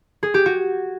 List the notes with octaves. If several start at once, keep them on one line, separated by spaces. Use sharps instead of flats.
G#4
G4
F#4